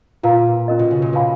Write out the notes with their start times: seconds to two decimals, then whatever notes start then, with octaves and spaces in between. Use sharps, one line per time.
0.23 A#2 F4 B4 F5 A#5
0.68 C#4 F4 A#4 D#5
0.79 B2
0.91 C#3
1.02 A#2
1.13 B2 G#4 B4 F5 G#5 B5